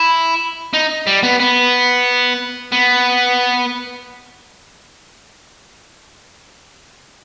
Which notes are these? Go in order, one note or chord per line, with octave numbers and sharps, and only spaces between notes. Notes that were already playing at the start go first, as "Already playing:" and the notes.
Already playing: E4
D#4
G3
B3
B3
B3